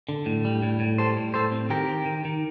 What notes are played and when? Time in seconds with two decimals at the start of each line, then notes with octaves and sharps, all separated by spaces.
0.09 D3
0.26 A2
0.45 G3
0.63 A2
0.80 A2
0.98 G3 A4 C5
1.17 A2
1.34 A2 A4 C5
1.52 C4
1.70 D#3 G4 A#4
1.88 D#3
2.06 D#3
2.25 D#3